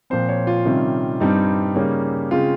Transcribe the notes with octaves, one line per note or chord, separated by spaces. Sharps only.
A#2 F3 C4 C5
C#5
F4
C3 D#3 G3 C#4
G2 G3 C4 D#4
C#3 G3 A#3 C#4
C#3 G#3 C4 F4